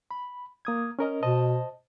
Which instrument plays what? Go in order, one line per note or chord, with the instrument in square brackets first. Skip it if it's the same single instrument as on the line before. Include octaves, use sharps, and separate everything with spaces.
[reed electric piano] B5
A#3 D#6 G#6
C#4 A#4 D#5
[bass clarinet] B2 [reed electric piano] C5 D#5 A5